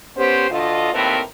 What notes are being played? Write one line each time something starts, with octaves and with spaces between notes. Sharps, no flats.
B3 C#4 G4 C5
D2 D3 A3 F4 D#5
D#2 A2 A3 C4 A#4 B4